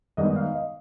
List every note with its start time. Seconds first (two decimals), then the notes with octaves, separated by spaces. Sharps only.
0.17 G#2 D#3 G3 B3 D#5
0.36 F5
0.54 D#5